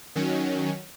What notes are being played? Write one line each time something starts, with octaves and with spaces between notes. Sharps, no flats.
D#3 F#3 C#4